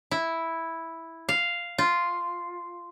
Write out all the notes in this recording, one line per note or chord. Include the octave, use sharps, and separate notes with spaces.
E4
F5
F4